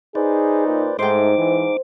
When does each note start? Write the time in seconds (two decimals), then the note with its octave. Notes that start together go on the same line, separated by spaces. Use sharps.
0.15 D#4 G#4 B4 C5 D5
0.66 A#2
0.99 G#2 A3 D#4 C5 G5 D6
1.38 G#2 E3